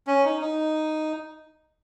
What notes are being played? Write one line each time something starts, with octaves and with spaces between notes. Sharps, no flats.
C#4
D#4
D#4